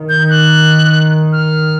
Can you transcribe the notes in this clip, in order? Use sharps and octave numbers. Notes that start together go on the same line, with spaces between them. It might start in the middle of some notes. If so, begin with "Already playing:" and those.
Already playing: D#3
G6
F#6
F6